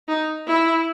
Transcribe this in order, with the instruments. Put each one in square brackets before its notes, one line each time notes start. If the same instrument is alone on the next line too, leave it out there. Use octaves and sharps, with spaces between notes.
[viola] D#4
E4